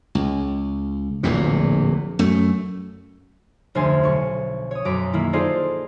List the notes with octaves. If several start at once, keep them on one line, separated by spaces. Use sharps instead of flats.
C#2
D1 A#1 E2 A#2
F#2 A3
F1 D2 C5 E5 G#5 A6
B1 C#6
C#5 D#6
B1 F#2 A#5 D6 B6 D7
D#3 A#3 E4
D#4 F4 G#4 A4 C5 D5